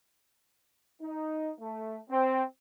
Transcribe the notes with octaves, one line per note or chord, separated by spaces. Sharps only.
D#4
A3
C4